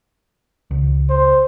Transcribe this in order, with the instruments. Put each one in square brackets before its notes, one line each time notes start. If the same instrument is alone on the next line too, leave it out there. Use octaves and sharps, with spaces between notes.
[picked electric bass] C#2
[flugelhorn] C5